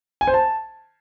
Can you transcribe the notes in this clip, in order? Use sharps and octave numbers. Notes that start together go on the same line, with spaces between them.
G#5
C5
A5